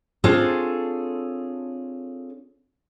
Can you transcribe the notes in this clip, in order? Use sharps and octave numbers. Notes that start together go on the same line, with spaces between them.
C4 D4 F4 G#4 A4 C#5